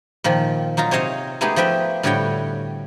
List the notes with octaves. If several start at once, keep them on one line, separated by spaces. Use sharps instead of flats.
A#2 D#3 F3
F#3 D#4 F4 A#5
C3 C5 C#5 D#5 F5
G#3 A3 B3 D#4 G4 G#4
F3 G4 B4 E5 G5
A2 D3 G3 F#4 C#5 G5